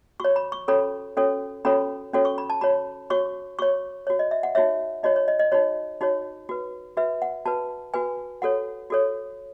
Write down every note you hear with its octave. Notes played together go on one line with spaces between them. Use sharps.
F#4 C#5 C#6
B5
C#6
C#4 F#4 A4 C#5 B5
C#4 F#4 A4 C#5
C#4 F#4 A4 C#5 B5
C#4 F#4 A4 C#5
C#6
B5
A5
F#4 C#5 B5
F#4 C#5 C#6
F#4 C#5 C#6
F#4 C#5
D#5
E5
F#5
D#4 F#4 C#5 E5
D#4 F#4 C#5 D#5
C#5
D#5
D#5
D#4 F#4 C#5
D#4 F#4 C#5
F#4 B4
F#4 B4 E5
F#5
F#4 B4 A5
F#4 B4 G#5
F#4 A4 C#5 F#5
F#4 A4 C#5